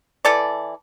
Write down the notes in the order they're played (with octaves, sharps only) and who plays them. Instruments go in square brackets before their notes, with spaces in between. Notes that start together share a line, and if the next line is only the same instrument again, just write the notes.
[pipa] E3 A4 D5